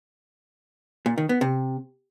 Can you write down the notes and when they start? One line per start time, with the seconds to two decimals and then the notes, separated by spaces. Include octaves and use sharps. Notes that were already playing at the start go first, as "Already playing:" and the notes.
1.06 A#2
1.18 D#3
1.29 B3
1.41 C3